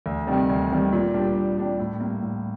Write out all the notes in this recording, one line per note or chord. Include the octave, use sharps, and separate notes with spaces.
D2
C3 D#3 G3
D2
C3 D#3 G3
A#2
G3 D4 G4
A#2
G3 D4 G4
A2
G3 A#3
A2